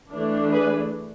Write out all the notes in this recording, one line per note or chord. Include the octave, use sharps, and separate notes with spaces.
E3 A3 D4
G#4 B4